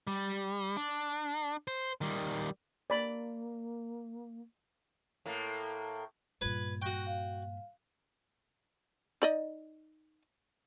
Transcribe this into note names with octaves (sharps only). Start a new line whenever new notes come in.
G3
D4
C5
D#3 G3
A#3 D5 B5
A2 A#3
G2 A#2 F4 B4 B5 G#6
F#4 G5 C#6 F#6 A#6
F5
D#4 D5 D#5